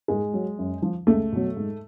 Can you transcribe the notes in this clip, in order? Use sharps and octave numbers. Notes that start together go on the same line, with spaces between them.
G#2 G#3
F#3
F#2
F3
C#2 A3
B2 F#3
G#2